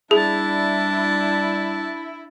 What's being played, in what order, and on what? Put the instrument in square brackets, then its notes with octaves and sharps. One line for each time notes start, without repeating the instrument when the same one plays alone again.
[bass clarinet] G3 [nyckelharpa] D4 A5 [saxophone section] E4 [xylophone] G#4